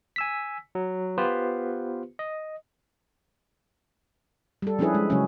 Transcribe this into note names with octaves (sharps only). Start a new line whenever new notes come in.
G#5 E6 B6
F#3
B3 F4 G4 B4 C5
D#5
G3 A4
F3 C#4 D4 E4 G#4 B4
G#3
C#3 F#3 G#3 C#4